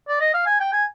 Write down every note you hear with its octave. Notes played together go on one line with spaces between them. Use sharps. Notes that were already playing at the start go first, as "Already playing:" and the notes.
D5
D#5
F5
G#5
G5
G#5